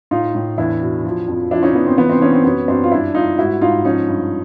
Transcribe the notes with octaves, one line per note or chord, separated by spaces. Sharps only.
A2 D#4 F4
A2
E2 D4 E4
B2
F3
F2
F3 D4 E4
C#4 D#4
F3 B3
C4
E3 B3
C4 D4
E3 C#4 D#4
C4
F#2 B3 C#4
F#2 C4 D4
F4
G2 D4 E4
G2 D#4 F4
G#2 E4 F#4
G#2 D#4 F4
F3 C#4 D#4
G2